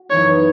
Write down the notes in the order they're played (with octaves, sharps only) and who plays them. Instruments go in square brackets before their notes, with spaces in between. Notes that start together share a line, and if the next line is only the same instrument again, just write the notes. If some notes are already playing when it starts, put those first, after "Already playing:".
Already playing: [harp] F#4
[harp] F#2 E3 B3 D#4 [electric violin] C#5